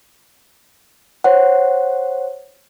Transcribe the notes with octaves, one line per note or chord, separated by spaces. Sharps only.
C5 C#5 F#5